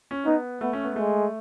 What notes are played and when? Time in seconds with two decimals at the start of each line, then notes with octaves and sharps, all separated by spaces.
0.11 C#4
0.26 B3 D#4
0.61 A3 B3
0.73 C#4
0.84 B3
0.95 G#3 A3